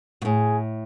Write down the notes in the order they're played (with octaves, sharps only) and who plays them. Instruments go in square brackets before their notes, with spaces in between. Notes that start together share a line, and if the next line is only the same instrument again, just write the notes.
[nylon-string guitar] B2
[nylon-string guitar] A2 [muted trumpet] G#4